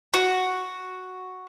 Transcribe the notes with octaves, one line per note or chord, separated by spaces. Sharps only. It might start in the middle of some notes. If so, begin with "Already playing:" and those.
F#4